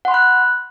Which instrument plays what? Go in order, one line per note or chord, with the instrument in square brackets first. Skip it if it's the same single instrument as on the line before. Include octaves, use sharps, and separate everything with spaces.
[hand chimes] F#5
C6
B5
F#6